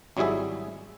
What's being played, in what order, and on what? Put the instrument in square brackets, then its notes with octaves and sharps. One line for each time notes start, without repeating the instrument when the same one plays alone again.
[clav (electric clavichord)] G#1 F#3 G3 E4 G#4 E5